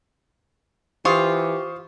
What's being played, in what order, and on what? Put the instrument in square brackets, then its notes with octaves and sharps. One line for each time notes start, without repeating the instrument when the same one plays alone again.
[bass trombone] E3 [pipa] F4 [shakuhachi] G4 [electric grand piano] C5 C#6 D#6